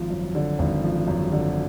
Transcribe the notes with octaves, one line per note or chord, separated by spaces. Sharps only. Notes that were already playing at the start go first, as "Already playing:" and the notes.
Already playing: G#1 F3
F#2
D3
G#1
F3
F#2
D3